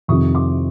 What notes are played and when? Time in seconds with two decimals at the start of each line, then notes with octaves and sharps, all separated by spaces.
0.08 F2 C3 D#3 C#6 D#6
0.34 C6 D6